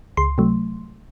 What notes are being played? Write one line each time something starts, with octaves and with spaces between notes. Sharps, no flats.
C#2 C6
C3 F#3 A3